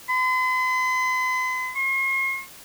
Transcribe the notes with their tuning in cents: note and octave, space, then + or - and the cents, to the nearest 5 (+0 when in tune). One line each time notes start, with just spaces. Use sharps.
C6 -45
C6 +45